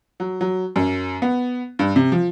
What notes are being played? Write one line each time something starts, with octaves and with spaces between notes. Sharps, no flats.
F#3
F#3
F#2
B3
G2
C3
F3